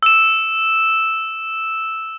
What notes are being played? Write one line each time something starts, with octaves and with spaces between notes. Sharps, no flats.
E6 E7